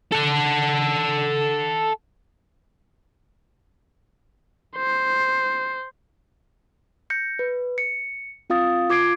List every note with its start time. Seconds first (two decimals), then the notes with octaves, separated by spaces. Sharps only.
0.12 A4 F#5
4.77 C5
7.10 G6 A#6 C#7
7.39 B4
7.78 C#7
8.50 C4 F4 F5 D#6 A6
8.89 F4 D6 G#6 C7 D7